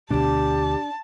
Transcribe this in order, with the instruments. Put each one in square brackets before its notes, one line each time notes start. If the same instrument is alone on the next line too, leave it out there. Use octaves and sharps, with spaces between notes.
[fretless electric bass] D2 B2 [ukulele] D4 [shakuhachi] G4 [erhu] A5